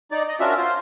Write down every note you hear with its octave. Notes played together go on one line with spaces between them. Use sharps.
D#4 D5
D#5
C#4 D4 F4 F#4 A#4 E5
F4 C5